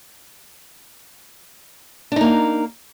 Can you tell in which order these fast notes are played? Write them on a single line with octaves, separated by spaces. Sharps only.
D4 D#4 A#3